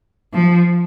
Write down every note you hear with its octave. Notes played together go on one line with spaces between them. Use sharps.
F3